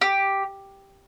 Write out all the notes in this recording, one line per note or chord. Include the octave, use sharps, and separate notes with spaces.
G4